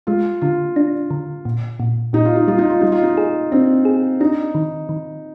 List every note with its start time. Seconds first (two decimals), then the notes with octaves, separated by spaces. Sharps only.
0.07 G#3 F4
0.41 D3 F4
0.76 D4
1.11 D3
1.45 A#2
1.80 A#2
2.13 A#2 D#4
2.25 F4
2.36 D#4
2.48 G3 F4
2.58 D#4
2.70 F4
2.81 G3 D#4
2.92 F4
3.03 D#4
3.17 G#4
3.52 C4 D4
3.85 G#4
4.20 D4 D#4
4.55 D#3
4.89 D#3